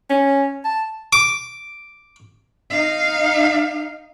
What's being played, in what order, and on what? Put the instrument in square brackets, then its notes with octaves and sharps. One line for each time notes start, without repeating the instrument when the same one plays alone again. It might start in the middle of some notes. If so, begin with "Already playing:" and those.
[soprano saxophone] C#4
A5
[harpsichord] D6
[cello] D#4 F5